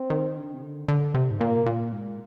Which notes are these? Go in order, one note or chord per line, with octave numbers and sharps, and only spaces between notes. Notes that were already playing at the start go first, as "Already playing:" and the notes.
Already playing: C4
D#3
D3
C3
D3
D3
C3
G#2
A#2 A#3
A#2
G#2